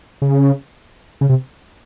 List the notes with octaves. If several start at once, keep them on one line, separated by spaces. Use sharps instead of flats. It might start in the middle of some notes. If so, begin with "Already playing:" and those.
C#3
C#3
C3